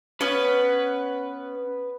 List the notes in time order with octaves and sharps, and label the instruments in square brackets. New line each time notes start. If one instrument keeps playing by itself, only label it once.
[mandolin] B3 C#4 [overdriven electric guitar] B4